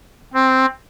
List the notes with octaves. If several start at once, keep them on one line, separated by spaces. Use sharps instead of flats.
C4